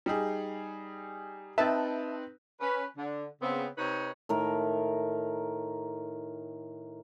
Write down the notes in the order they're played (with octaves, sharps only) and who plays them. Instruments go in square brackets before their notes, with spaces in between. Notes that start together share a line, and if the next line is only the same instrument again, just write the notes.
[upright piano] G3 D#4 G#4
[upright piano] C4 D#4 B4 [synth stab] E5 A5
[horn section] C#4 B4
D3
C#3 B3 C4
C3 D#4 B4 C#5
[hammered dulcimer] A2 D#3 A#4